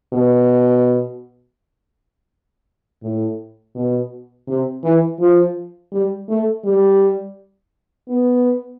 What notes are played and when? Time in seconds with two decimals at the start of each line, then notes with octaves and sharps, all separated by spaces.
0.13 B2
3.03 A2
3.75 B2
4.48 C3
4.83 E3
5.19 F3
5.92 G3
6.29 A3
6.65 G3
8.09 B3